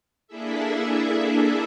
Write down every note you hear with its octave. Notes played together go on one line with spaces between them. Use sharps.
A#3 D4 E4 G#4 A4 E5